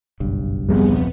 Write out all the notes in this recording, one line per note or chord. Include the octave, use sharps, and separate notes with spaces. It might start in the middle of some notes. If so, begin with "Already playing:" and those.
F#1 B1 G2
D#1 F3 G3 B3 C4 G#4